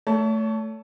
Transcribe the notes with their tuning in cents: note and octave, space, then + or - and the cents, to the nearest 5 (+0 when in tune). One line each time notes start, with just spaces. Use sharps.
A3 +0 C#5 +35 A5 +0